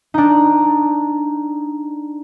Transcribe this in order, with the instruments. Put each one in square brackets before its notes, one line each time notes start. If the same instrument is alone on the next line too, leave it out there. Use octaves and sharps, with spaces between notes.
[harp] D4 D#4